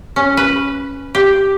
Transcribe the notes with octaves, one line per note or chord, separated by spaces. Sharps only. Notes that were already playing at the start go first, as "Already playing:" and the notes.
C#4
B4
G4